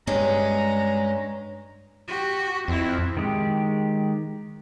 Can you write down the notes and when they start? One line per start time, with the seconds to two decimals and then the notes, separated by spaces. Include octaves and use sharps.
0.07 G2 G#3 C#4 D#5 A#5
2.08 F#4 G4
2.68 F2 C4 E4
3.17 D#3 G#3 G4